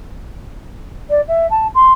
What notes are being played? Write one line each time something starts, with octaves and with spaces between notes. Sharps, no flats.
D5
E5
A5
C6